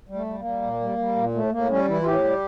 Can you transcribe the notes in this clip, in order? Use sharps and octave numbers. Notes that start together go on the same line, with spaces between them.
G3
A3
G3
A#3
G3
A#2
G3
G3
A#2
A2 A3
A2 A#3
G3 C#4
E3 E4
F4
A2 G4
G3